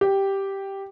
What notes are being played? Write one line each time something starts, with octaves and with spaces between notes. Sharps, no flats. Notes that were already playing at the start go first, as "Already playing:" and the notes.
G4